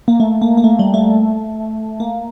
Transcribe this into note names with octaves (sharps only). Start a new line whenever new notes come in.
A#3
A3
A#3
A#3
A3
G3
A3
A#3